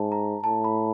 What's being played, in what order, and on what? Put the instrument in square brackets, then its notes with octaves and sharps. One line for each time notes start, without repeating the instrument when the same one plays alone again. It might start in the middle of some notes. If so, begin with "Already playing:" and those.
Already playing: [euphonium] G#2 [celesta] A5
[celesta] A#5
[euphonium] A2 [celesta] A5
[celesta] B5